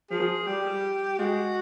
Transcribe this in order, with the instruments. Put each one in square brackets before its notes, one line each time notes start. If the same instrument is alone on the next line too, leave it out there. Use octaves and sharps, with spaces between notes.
[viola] F3 [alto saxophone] G#4
[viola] G3 [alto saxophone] G4
[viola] G#3 [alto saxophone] F#4